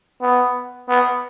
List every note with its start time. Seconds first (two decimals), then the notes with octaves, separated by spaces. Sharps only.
0.21 B3
0.88 B3